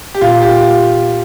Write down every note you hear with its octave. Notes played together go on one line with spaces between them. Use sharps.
G4
A#2 F4
G4